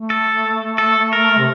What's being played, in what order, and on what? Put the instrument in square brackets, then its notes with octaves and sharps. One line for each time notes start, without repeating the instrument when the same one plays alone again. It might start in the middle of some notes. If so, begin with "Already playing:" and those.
Already playing: [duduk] A3
[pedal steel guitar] A4
A4
A#4
[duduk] C3